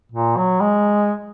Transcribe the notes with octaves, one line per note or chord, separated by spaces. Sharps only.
A#2
F#3
G#3